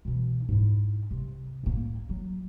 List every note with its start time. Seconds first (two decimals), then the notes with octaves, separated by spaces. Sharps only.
0.05 B2 E3
0.49 G#2 E4
1.11 C3
1.63 A2 A#3
2.09 F#3